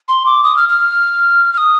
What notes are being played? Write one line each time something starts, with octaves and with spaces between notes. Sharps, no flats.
C6
D6
D#6
F6
F6
F6
D#6